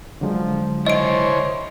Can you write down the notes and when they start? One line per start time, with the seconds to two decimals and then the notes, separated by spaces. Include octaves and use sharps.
0.21 D3 F3 F#3 G#3
0.86 E4 C5 C#5 D#5 D7